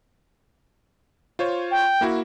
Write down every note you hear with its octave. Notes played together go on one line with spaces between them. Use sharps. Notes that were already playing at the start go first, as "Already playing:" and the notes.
F4 C5 C#5
G5
A#3 E4 F#4